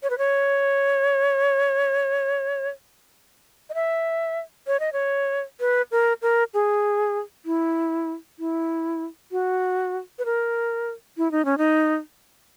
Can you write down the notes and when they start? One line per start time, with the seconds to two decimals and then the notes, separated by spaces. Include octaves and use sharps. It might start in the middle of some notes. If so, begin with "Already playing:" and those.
0.03 C#5
0.10 B4
0.18 C#5
3.70 D#5
3.75 E5
4.67 C#5
4.80 D#5
4.93 C#5
5.60 B4
5.91 A#4
6.22 A#4
6.54 G#4
7.46 E4
8.39 E4
9.32 F#4
10.19 B4
10.25 A#4
11.17 E4
11.31 D#4
11.45 C#4
11.58 D#4